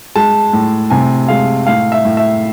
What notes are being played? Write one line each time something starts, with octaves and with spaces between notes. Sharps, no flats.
G#3 A5
A2
C3 G#5
G#3 F5
A2 F5
E5
A2
E5